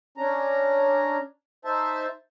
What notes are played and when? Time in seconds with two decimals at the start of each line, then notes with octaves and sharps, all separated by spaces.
0.18 C#4 D4 A#5
1.65 D#4 C5 E5 A5